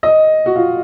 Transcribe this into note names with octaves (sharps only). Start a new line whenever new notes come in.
D#5
F#4
F4